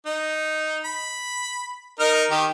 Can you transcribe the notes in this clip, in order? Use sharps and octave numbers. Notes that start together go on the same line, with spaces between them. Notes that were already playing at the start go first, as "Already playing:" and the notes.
D#4
B5
D#4 A#4 F6
D#3 G4